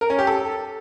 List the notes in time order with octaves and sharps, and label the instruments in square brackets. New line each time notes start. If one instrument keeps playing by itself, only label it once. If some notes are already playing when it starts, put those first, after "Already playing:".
[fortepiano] A#4
C#4
G4
A4